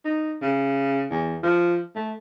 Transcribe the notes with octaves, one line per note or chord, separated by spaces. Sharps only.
D#4
C#3
E2
F3
A3